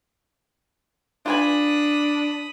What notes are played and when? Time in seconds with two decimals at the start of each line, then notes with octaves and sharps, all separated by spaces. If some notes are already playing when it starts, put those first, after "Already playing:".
1.26 D4 F4 B4 G#5 B5 D#6